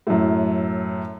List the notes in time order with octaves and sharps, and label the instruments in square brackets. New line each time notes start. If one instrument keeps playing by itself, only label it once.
[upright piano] F#2 A2